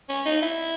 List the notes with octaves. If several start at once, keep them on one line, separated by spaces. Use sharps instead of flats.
C#4
D#4
E4